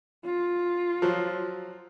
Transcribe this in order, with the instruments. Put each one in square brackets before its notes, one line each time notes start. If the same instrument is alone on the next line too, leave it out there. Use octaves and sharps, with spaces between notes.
[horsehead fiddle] F4
[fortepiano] F3 F#3